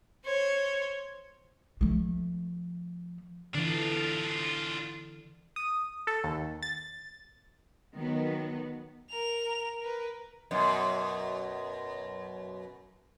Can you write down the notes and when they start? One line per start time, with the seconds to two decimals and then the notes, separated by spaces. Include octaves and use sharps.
0.25 C5 C#5
1.81 F3 A3
3.54 D3 E3 D4 F4
5.56 D#6
6.07 A4
6.24 D#2
6.63 A6
7.95 D#3 F#3 B3
9.10 A#4 F7
9.81 A#4 B4
10.51 F#2 B2